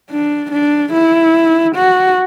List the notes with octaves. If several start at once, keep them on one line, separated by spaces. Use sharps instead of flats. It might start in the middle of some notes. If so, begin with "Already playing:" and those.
D4
D4
E4
F#4